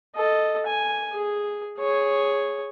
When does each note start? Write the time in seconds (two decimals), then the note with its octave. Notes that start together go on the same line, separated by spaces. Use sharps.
0.16 A4 D#5
0.66 G#5
1.13 G#4
1.78 G#4 C#5